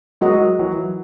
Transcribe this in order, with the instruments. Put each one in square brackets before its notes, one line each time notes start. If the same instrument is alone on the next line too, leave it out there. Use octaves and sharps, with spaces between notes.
[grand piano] F#3 G#3 [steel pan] F#4 A#4 D#5 F#5
[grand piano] E3 F#3